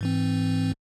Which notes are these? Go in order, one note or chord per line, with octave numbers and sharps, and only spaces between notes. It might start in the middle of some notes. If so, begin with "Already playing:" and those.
G#2 E3 C4